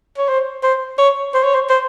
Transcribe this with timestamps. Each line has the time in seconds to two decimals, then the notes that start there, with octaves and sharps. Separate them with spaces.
0.18 C#5
0.28 C5
0.63 C5
0.98 C#5
1.34 C5
1.44 C#5
1.54 C5
1.69 C5